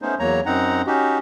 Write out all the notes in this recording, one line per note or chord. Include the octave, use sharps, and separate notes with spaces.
A3 B3 C#4 D#4 C5
E2 F#3 A#3 C#5 A#5
F#2 C4 D#4 F#5 A#5
C#4 D#4 F#4 G4